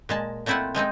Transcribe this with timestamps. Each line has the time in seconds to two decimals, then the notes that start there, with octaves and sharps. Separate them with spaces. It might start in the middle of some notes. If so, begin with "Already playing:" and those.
0.09 A#2 G#3 A5
0.46 A#2 A3 C4 E4 F4 F#5
0.75 F3 G#3 C4 D#4